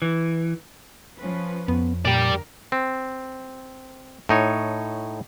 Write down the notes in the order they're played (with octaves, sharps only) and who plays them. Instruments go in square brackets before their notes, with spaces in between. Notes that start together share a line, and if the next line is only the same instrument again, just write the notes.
[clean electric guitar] E3
[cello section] F3 C#4 B4
[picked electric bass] F2 [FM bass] B3
[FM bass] A#2 [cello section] D3 A#4 [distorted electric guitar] G4 D5
[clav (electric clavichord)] C4
A2 D#4 C#5